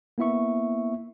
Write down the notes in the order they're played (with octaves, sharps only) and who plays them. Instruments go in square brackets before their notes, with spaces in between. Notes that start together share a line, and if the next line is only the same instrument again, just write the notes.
[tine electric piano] A#3 B3 E4 E5 C#6